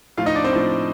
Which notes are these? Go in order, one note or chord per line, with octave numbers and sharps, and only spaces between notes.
A2 F3 F4 F5
D#4 D#5
D4 D5
C4 C5
A2 F3